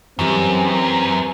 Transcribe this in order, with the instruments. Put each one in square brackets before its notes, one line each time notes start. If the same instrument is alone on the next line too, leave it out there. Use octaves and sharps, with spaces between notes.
[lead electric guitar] F#2 [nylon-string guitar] E3 G3 A#4 [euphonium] C4